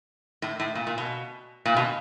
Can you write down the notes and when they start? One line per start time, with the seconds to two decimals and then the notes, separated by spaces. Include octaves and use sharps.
0.42 A2
0.60 A2
0.75 A#2
0.87 A#2
0.98 B2
1.65 A#2
1.76 B2